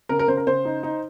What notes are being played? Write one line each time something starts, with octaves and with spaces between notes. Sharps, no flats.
C#3 A#4
A#4
C#3 C5
A#4
C#3 C5
D#4
D#4